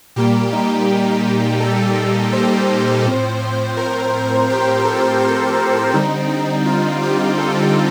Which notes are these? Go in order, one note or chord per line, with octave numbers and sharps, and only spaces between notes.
A#2 G3 A#3 G4
D#4
A4
C5
A2 F3 C4
A#4
G4
A4
G4
D3 G3 C4 D#4
D#4
F4
G4
A4